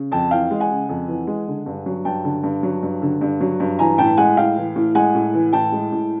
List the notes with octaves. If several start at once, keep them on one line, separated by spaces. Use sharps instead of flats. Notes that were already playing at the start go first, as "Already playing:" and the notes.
Already playing: C#3
F2 G5 A5
E3 F5 G5
G#3
F#5 G#5
C#3
F2
E3
G#3
D3
G2
F#3
G2 G5 A5
D3
G2
F#3
G2
D3
G2
F#3
G2
E3 G#5 A#5
A2 G5 A5
G#3 F#5 G#5
A2 F5 G5
E3
A2
G#3 F#5 G#5
A2
E3
A2 G5 A5
G#3
A2